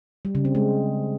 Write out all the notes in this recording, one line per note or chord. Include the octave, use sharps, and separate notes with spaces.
G3
C#3
C4
G#3